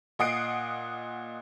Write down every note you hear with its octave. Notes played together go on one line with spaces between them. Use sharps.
A#2 D#5 F#5 D#6 C7 D7